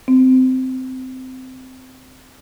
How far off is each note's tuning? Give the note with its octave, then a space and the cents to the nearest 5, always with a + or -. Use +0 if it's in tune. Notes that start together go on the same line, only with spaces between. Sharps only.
C4 -15